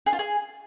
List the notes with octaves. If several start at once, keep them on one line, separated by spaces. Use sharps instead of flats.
G#4
F4
G#4